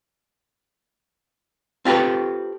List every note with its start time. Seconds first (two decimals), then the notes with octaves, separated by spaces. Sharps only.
1.85 C4 F4 G4 A4 B4